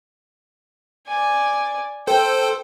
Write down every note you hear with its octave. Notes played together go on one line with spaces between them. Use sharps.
D5 G#5
A4 C5 G5